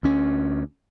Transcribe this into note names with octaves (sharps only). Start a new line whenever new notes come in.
D2 C#4